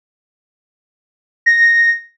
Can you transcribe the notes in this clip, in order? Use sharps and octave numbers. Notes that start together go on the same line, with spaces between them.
A#6